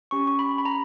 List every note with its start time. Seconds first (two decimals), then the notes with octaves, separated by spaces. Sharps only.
0.11 C#4 G4 C#6
0.27 C#6
0.39 B5
0.58 B5
0.65 A#5